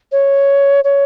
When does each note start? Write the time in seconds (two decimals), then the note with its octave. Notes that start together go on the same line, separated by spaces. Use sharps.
0.12 C#5
0.84 C#5